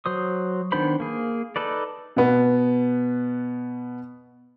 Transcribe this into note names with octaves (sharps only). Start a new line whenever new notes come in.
F#3 C5 D#6
D#3 B3 D4 C5 B5
A#3 G#4
D#4 A4 B4 D5
B2 B3